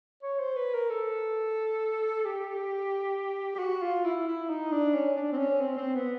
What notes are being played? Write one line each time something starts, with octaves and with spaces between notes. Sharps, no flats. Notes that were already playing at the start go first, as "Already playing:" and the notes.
C#5
C5
B4
A#4
A4
G4
G4
F#4
F4
E4
E4
D#4
D4
C#4
D4
C4
C#4
C4
C4
B3